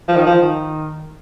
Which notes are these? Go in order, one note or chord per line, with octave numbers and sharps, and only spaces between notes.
F3
D#3
F3
D#3